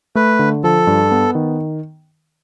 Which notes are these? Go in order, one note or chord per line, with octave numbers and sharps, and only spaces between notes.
A3 B4
D3
F3 A4
G2
B3
D#3